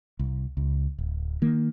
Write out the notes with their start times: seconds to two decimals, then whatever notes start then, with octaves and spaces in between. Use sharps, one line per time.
0.19 C2
0.57 C#2
0.98 D1
1.42 D#3 A#3